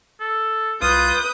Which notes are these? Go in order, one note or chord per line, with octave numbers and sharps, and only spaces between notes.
A4
C2 F4 B4 D#6 G6